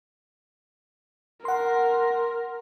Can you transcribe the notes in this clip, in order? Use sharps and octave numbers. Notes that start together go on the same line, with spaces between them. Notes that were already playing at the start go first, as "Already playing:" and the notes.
A#4 F#5 C6